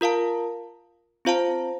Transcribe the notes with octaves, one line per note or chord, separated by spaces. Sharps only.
F4 A#4 F5 A5
C4 F4 C5 F5 A5